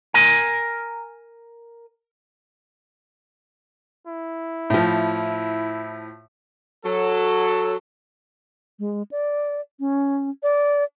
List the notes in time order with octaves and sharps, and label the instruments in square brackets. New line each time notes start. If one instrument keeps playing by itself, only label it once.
[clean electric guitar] A#4 G#5
[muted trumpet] E4
[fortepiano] A2 F3
[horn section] F#3 A4
[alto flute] G#3
D5
C#4
D5